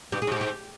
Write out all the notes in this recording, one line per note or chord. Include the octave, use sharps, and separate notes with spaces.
G2 G4
G#4
G#2 G4
G4